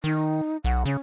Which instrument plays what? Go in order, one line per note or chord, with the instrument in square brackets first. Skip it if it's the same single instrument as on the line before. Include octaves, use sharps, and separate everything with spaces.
[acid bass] D#3 [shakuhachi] D#4
[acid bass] B1 [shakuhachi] F#5
[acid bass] C#3 [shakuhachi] C#4